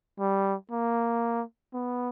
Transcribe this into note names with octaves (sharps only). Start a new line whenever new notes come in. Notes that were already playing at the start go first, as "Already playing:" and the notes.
G3
A#3
B3